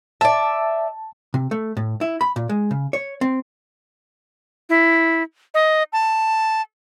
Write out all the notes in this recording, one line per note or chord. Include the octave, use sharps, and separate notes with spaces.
D5 E5 A5
C3
A3
A2
E4
B5
A#2
G#3
C#3
C#5
C4
E4
D#5
A5